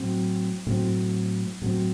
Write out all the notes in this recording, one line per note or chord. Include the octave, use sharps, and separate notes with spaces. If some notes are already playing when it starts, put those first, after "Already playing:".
Already playing: A2 F#3 C4
A2 F#3 C4
A2 F#3 C4